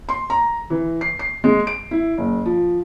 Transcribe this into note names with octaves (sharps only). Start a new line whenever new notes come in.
C6
A#5
E3
C7
C7
G#3
D7
E4
F#1
F3